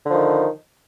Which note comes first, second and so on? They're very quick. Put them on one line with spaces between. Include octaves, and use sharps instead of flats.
D3 F3 D#3